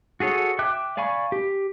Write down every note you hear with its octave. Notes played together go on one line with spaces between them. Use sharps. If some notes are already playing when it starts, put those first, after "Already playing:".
F#4 G#4 A4 C#5
E5 G5 D6 F#6
D5 F5 G#5 B5 C#6
G4